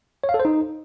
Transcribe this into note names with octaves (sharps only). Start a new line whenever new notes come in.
C#5
F5
A4
C5
D#4